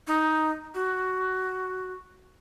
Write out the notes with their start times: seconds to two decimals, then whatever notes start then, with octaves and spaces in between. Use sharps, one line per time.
0.07 D#4
0.75 F#4